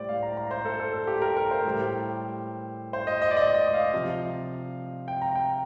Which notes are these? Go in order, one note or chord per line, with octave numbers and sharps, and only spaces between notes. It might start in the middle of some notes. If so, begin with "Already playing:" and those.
Already playing: A2 G3 C5 D5
F5
A#5
A#5
C5
A4
A4
A4
G4
A#4
A#4
C5
A2 G3
C5
D#5
D#5
D5
D#5
D#5
F5
C3 F3
G5
A#5
G5